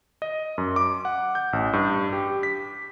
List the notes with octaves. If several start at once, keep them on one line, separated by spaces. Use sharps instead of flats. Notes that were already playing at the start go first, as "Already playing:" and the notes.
D#5
F#2
D6
F#5
G6
A1
G2
G4
B6